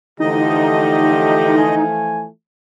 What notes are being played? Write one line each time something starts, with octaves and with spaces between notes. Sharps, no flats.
D3 E3 F3 A3 D#4 G4 D#5
G#5